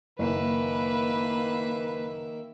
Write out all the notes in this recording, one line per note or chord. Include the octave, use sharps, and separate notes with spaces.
F#1 D#3 A#3 B4 E5